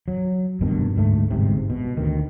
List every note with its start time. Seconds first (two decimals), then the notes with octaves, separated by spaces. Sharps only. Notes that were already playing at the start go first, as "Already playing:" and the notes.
0.08 F#3
0.61 F1 G2 B2 D#3
0.96 D2 G#2 A3
1.31 G1 G#2 C3
1.70 B2
1.97 D2 D#3